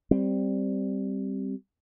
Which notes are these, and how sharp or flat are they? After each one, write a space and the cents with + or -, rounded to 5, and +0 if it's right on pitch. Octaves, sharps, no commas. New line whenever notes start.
G3 +0 C4 +0